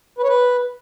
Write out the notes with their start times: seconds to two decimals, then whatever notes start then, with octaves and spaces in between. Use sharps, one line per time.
0.18 B4
0.24 C#5
0.29 B4